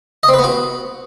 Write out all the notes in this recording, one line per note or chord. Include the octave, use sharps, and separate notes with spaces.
D#5
C4
B4
B3
F#4